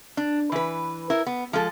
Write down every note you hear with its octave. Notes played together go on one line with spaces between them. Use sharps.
D4
E3 B4
E4 A#4
B3
F3 G#3 A4